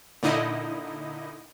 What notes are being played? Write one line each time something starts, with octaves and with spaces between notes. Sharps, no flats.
A#2 D3 D#4 E4 D#5